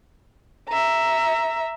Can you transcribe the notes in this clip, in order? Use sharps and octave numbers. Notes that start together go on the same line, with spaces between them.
E5 A#5